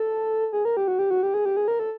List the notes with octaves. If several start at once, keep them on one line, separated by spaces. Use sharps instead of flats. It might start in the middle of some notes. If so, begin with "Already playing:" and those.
Already playing: A4
G#4
A#4
G4
F#4
G4
F#4
G4
G#4
G4
G#4
A#4
A4